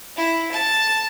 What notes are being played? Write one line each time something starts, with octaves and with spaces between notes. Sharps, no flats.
E4
A5